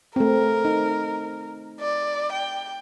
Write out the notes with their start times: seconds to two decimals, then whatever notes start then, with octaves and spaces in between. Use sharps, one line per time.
0.16 A3 C4 A#4
0.65 D#4
1.81 D5
2.32 G5